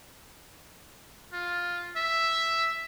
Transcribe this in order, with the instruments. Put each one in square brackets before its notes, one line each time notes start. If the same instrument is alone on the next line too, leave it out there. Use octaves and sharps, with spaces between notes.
[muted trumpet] F4
E5